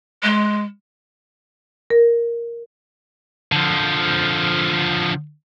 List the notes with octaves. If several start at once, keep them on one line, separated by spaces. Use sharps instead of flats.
G#3
A#4
D3 F3